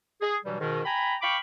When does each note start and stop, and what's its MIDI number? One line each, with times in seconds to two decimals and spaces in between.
0.21 0.37 68
0.45 0.58 43
0.45 0.58 47
0.45 0.58 52
0.45 0.58 54
0.45 0.58 55
0.60 0.80 44
0.60 0.80 47
0.60 0.80 51
0.85 1.16 79
0.85 1.16 80
0.85 1.16 82
0.85 1.16 83
1.21 1.37 77
1.21 1.37 79
1.21 1.37 83
1.21 1.37 85
1.21 1.37 86